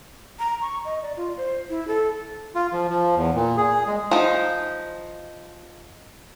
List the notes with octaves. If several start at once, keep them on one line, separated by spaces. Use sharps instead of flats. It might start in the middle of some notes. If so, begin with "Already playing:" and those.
A#5
C#6
D#5
D5
F4
C5
E4
A4
F4
F3
F3
E2
A#2
G#4
G#3
F3 D#4